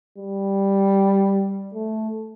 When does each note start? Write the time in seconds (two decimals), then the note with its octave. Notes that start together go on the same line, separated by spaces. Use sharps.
0.18 G3
1.74 A3